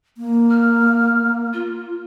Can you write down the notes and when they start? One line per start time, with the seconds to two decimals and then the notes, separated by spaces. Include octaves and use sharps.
0.18 A#3
0.50 F6
1.53 F4